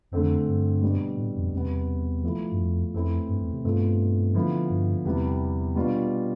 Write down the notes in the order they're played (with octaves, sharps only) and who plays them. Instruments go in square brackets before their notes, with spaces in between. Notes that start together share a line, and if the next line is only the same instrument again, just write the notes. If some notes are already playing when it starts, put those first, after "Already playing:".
[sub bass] F2 [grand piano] D3 A3 C4
[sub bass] G2
[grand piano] B2 G3 D4
[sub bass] A2
F2
[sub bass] E2 [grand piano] C3 G3 B3
[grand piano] F3 A3 E4
[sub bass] G2
F2
[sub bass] F2 [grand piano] E3 A3 C4 E4
[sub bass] G2
E2
C3
[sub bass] G2 [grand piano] B2 A3 C4 F4
[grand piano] D3 F3 B3 E4
[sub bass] G2
[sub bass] E2 [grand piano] C3 E3 G3 B3
[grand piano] B2 G3 D4 F4